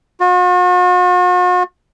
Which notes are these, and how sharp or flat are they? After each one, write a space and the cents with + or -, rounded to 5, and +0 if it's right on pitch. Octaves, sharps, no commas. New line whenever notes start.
F#4 -45